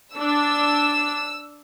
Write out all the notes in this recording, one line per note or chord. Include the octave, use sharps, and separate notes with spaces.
D4 E6